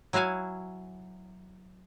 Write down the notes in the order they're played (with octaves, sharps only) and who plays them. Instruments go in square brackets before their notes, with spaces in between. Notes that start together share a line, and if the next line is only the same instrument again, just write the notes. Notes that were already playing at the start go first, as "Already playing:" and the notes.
[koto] F#3 E4 F#4 F5 G#5